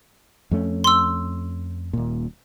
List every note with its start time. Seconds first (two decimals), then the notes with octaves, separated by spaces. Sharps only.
0.51 F2 A3 C#4
0.84 C6 E6
1.93 D#1 A#2